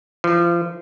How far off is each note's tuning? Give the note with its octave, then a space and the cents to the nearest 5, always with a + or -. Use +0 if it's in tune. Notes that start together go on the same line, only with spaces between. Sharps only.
F3 -30